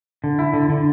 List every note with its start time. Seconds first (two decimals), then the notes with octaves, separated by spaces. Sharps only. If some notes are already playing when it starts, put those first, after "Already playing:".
0.24 D3
0.39 E4
0.54 D3
0.69 D3